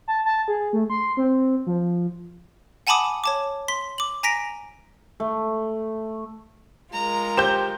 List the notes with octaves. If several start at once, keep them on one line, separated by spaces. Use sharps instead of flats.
A5
A5
G#4
A3
C6
C4
F3
F#5 G#5 A5 B5 D6 D#6
C#5 A5 D6
C6 B6
D6 F#7
G#5 A#5 A#6 B6 D7
A3
G#3 F4 A#4 A#5
G4 C5 G6 E7